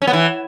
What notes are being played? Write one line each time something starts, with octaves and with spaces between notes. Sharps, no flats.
C#4
B3
E3